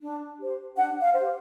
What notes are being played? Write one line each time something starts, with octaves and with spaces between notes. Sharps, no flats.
D4
G4 C5
D4 F#5
F5
G4 C5